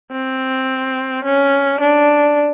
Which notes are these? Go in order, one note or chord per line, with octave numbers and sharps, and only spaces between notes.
C4
C#4
D4